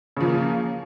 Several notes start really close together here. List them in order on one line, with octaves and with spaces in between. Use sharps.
C#3 F3 A#3